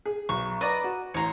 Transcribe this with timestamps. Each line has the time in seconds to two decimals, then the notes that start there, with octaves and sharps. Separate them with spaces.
0.05 G#4
0.29 B1 C#6
0.61 B4 D5 D#5 A#5
0.84 F#4
1.14 A1 C#5 A#5 C6